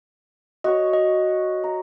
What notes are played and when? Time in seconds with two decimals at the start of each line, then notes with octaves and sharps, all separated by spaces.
0.64 F#4 C#5 D#5
0.93 D#5
1.64 A#5